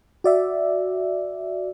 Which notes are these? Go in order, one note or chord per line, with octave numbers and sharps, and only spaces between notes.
F#4 D5 E5